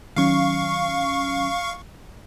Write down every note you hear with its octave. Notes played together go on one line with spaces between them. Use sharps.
D#3 F#3 C#4 F5 C#6